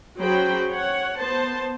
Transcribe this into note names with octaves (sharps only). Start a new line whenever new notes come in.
F#3 C#4 G#4 C5 G5 B5
C#5 F#5
B3 C5 A5